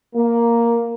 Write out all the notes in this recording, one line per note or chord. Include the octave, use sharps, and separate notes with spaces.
A#3